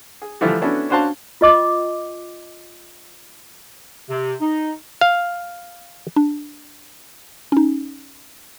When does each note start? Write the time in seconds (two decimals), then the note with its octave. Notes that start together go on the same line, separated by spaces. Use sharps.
0.22 G#4
0.41 D3 E3 F3 G3 A3 E4
0.61 B3 C#4 D4 E4 F#4 A4
0.89 C#4 D4 F#4 C5 F5 A5
1.41 F4 D#5 D6
4.09 C3
4.41 D#4
5.01 F5
6.16 D4
7.52 C#4 D#4